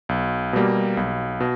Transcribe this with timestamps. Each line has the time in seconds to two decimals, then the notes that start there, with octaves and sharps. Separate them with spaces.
0.09 B1
0.53 B2 G3 A#3
0.97 B1
1.40 B2